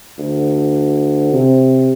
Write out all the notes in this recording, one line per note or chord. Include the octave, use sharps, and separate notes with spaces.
D2
C3